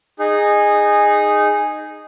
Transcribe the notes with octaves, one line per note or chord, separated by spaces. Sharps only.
D#4 G#4